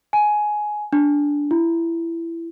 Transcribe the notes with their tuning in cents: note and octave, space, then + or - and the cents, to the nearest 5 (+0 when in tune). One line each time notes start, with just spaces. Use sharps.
G#5 +15
D4 -10
E4 +20